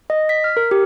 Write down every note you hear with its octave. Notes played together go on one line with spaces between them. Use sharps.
D#5
B6
F6
A#4
G4